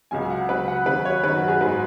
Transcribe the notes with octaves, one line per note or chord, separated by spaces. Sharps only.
C#2 C#3 F#3 G#5
F#5
C#2 C#3 F#3 B4
F#5
D#2 C#3 F#3 B4
C#5
F#2 D#3 F#3 B4
F#4
G#4
G#2 F#3 B4